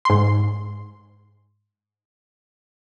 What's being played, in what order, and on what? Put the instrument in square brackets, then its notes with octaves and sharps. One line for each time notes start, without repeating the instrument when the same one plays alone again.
[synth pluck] G#2 C6